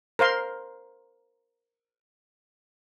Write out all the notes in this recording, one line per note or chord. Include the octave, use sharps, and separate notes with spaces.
A#4 C5 F5 C6